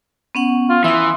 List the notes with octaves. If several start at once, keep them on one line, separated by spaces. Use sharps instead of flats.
B3 C#4 F#5
F4
E3 E5 C6 D#6